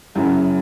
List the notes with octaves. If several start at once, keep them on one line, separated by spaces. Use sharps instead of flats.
F#2 C#3 F#3 E4